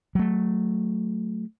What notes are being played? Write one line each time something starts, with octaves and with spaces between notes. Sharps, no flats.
F#3 A3